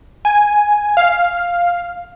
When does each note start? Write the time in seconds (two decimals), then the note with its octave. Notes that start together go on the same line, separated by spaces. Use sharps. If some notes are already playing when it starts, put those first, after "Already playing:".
0.25 G#5
0.97 F5